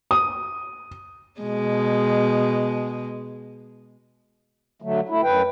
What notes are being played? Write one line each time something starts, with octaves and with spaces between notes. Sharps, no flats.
D#6
B2 G#3
D3 F#3 A3
A3 E4
F#2 B4 G5